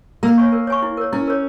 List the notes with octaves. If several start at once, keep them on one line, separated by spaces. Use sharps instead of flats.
A#3 A#4
C#5 G#5 C#6
A#4
C#5 G#5 C#6
E4
A#4 C#5
C#4 E4
A#4 C#5